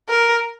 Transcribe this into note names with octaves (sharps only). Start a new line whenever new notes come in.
A#4